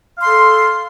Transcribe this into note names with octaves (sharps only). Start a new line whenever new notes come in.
A4 F5 C6